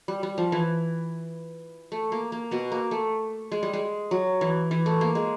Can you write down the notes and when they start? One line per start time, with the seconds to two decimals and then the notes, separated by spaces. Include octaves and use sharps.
0.08 G3
0.23 G3
0.38 F3
0.52 E3
1.92 A3
2.12 A#3
2.32 A#3
2.51 B2 B3
2.72 A#3
2.91 A3
3.52 G#3
3.63 G3
3.73 G#3
4.11 F#3
4.41 E3
4.71 E3
4.86 A3
5.01 A#3
5.15 G#3